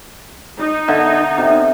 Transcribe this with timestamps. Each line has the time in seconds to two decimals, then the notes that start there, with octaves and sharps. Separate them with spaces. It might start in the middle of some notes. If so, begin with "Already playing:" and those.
0.59 D#4
0.88 D3 E5
1.38 C3